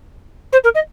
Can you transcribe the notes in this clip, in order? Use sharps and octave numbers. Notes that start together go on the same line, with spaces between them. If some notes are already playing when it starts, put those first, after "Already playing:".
C5
A#4
D#5